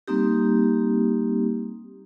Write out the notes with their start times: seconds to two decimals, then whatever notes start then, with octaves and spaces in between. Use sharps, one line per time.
0.08 G3 A#3 C4 D#4 G4